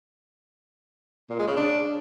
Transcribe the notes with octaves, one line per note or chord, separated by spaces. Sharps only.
A#2
G#3
C#3
D4